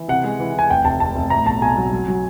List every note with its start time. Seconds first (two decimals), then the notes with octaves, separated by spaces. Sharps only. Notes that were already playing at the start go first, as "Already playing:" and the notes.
Already playing: E3
0.08 C3 F#5
0.24 G#3
0.40 E3
0.55 E3 G#5
0.70 F1 G5
0.85 F1 A5
1.00 F1 A5
1.16 F1
1.30 A2 A#5
1.46 B1 A5
1.62 B1 G#5
1.77 F#3
1.92 F#3
2.08 F#3